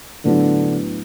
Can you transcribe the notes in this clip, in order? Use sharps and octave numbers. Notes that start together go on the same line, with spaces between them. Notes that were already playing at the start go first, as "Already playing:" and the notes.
A2 D3 F#3 B3 D4